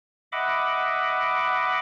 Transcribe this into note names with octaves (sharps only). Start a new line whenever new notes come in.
D#5 E5 F#5 B5 D6